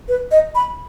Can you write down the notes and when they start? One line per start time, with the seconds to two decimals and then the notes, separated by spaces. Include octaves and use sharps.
0.08 B4
0.31 D#5
0.55 B5